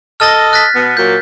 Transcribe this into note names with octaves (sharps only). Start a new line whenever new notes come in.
A4 D#5 F6 A6 A#6
F#6 A6 B6
B2 B3
A#2 F#3 A#3 G6